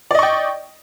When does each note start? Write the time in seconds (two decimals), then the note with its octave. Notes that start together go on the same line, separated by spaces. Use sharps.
0.11 D5
0.15 D#5
0.19 C#6
0.23 G5